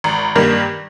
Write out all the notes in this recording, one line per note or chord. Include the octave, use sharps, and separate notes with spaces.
G#1
G2 D#3 A#3